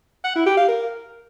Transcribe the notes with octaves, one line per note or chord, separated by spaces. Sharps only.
F#5
E4
G4
F5
A#4